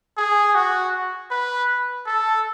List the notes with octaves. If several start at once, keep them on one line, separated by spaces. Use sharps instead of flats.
G#4
F#4
B4
A4